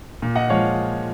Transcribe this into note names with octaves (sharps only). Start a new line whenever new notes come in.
A#2
D#5 F#5
F3 G#3 C#5 F5